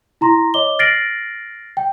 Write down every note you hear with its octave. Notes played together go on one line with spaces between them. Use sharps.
E4 A#5 C6 A#6
C#5 D#5 D6 G7
F6 A6 A#6 C7 D7 F#7
G5